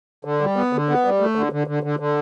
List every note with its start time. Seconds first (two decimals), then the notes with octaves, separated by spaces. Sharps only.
0.25 D3
0.41 G3
0.56 B3
0.73 D3
0.89 B3
1.05 G3
1.20 A3
1.35 D3
1.52 D3
1.67 D3
1.83 D3
1.99 D3